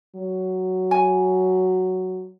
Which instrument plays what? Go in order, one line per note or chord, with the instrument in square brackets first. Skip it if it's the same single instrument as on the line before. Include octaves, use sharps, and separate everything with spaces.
[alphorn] F#3
[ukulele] G#5